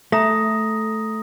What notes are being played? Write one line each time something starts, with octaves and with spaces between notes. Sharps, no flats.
A3 A#5 D#6 A#6